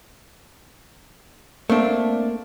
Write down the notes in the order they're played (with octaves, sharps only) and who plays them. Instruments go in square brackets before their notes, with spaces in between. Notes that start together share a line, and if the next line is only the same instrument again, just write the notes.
[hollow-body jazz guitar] A3 C4 D4 [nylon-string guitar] A#3